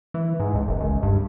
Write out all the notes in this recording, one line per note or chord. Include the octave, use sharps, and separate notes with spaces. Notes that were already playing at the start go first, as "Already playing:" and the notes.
E3
G#2
C#2
F#1
C#2
G2